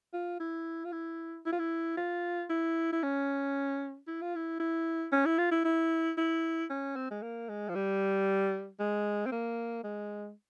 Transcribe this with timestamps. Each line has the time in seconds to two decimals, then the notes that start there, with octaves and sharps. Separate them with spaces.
0.13 F4
0.40 E4
0.85 F4
0.92 E4
1.46 E4
1.52 F4
1.59 E4
1.97 F4
2.50 E4
2.92 E4
3.03 C#4
4.07 E4
4.22 F4
4.36 E4
4.60 E4
5.12 C#4
5.25 E4
5.38 F4
5.51 E4
5.65 E4
6.17 E4
6.70 C#4
6.96 C4
7.11 G#3
7.22 A#3
7.49 G#3
7.69 F3
7.75 G3
8.80 G#3
9.26 C4
9.32 A#3
9.84 G#3